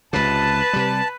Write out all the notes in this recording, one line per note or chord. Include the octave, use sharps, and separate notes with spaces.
C#2 C3 B4 A5
C3 G3